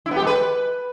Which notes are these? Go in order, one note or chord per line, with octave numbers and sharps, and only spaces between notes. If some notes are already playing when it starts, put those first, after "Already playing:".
E4
B3
G4
G#3
B4